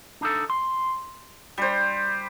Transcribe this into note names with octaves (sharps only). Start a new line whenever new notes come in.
D4 D#4 A4
C6
G3 C5